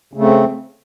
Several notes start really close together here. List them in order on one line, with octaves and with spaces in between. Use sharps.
C#3 A3 C4